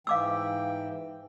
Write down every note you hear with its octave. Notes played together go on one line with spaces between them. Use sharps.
G#2 E3 F5 G5 D6 E6